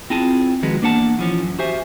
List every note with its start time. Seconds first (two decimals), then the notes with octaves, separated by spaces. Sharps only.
0.10 C4 E4 F4 G#4 G#5 A5
0.63 D#3 F3 G#3 F#4 B4
0.81 E2 A#3 D4 B4 F#5 A5
1.19 E3 F3 C#4
1.42 F#2
1.59 F#4 G4 C5 E5 G#5